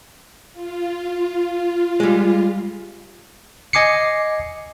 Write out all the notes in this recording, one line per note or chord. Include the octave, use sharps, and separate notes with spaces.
F4
G3 G#3
D#5 G#5 D6 C7 C#7